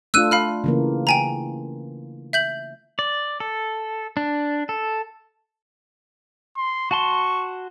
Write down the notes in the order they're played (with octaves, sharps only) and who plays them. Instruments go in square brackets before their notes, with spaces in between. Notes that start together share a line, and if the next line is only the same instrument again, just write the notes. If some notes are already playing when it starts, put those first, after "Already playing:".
[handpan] A3 D4 F4 [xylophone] E6 F#6 D#7
[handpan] F4 [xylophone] F5 B5 F6
[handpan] C#3 E3 A#3
[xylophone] G5 G#5 A#5
E5 G6 F#7
[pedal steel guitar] D5
A4
D4
A4
[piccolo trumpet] C6
[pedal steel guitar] F#4 A5 C6 [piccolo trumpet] C#6